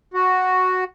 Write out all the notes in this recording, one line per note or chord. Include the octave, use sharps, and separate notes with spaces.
F#4